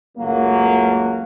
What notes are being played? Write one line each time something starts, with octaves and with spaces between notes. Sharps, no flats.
F#1 C#2 F#3 A3 A#3